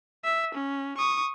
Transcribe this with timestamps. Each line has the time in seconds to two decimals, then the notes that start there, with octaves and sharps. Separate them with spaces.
0.24 E5
0.55 C#4
0.98 C#6 D#6